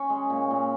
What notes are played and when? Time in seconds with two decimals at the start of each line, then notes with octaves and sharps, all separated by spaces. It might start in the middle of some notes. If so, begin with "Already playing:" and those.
Already playing: C#4 C#5
0.10 G#3
0.30 A#2
0.51 A#2